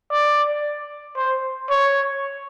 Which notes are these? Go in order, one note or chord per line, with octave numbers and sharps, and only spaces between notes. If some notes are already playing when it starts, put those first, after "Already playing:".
D5
C5
C#5